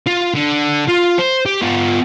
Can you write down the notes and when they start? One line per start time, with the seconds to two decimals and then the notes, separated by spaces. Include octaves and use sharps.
0.07 F4
0.34 D3
0.89 F4
1.19 C5
1.46 G4
1.62 B3 F4